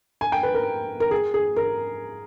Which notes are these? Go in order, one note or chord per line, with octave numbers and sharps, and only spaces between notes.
G#5
G5
B4
A#4
A#4
G#4
G#4
A#4